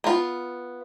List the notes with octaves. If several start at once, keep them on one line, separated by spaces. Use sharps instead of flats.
B3 F4